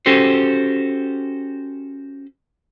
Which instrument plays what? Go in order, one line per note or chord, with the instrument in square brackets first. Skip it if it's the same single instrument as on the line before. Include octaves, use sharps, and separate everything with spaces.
[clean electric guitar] C#4 F#4 G4 A4 C5